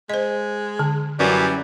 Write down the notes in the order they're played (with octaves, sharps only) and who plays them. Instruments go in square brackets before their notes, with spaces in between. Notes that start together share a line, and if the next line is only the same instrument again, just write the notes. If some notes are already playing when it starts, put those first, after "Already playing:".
[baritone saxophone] G#3 [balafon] C5 D#5
[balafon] D3
[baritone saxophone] F#2 [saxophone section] E3 G3